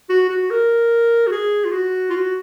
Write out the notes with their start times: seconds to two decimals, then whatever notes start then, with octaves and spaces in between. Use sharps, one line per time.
0.10 F#4
0.29 F#4
0.50 A#4
1.27 F#4
1.32 G#4
1.65 F4
1.73 F#4
2.10 F4
2.13 F#4